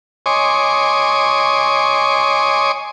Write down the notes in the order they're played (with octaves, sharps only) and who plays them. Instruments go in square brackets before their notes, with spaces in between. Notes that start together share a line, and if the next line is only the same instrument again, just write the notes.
[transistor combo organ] C#5 D#5 G#5 C6 D6